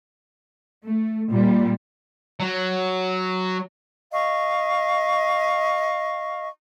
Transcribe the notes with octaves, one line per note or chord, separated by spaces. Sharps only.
A3
A#2 G3
F#3
D#5 F5 C#6